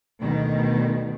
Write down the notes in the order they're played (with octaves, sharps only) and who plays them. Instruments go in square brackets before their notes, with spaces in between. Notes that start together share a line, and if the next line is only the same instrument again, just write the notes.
[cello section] D2 B2 D#3 G3